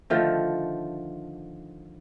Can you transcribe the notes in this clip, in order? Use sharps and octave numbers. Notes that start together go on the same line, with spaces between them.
D3 D#3 F3 A3